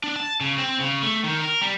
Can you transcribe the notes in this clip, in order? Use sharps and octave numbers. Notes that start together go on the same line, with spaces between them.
D4
A5
C#3
C4
C#3
A3
D#3
A#4
G3